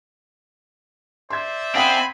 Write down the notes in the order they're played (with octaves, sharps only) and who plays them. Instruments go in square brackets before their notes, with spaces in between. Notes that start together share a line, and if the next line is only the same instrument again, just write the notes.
[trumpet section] C5 D5 E5 [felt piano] C6 G#6
[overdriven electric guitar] C4 [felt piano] F5 F#5 D#6 [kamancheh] G#5 B5